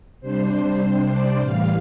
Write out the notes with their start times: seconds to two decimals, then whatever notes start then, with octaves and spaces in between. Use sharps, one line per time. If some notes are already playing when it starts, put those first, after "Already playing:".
0.21 C3 G3 D4 C5
1.09 D5
1.39 A2 E3 G3 F5